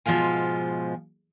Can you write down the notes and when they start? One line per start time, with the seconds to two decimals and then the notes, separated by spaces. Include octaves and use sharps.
0.06 G#2 B2 F3 G#3 F5 G#5